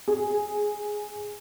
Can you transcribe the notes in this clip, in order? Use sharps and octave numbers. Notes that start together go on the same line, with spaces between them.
G#4